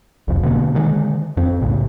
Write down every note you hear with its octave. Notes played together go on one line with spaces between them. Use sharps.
E1 C2 F2
B2 D3 A#3
D3 D#3 G#3
F2 C4
B1 A2 C#3